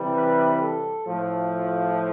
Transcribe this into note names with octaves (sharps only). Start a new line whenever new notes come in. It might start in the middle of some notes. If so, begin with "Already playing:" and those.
Already playing: C3 E3 G3
B4
A4
A2 F3 A3 F4
F4